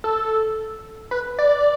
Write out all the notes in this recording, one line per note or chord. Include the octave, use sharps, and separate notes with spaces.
A4
B4
D5